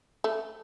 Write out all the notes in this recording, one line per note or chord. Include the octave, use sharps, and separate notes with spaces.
A3